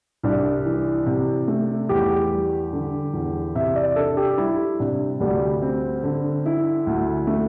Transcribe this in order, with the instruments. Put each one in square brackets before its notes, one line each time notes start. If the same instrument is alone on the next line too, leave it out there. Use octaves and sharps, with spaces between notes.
[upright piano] C2 [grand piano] D4
[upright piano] E3
C3
A3
[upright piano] E2 [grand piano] G4
[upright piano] G3
D3
E2
[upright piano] C3 [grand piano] E5
[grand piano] D5
[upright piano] D4 [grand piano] A4
[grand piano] G4
[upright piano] G3 [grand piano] E4
[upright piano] C3 [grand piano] D4
[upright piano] D2 [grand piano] G3
[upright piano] C4
D3
E4
D2
A3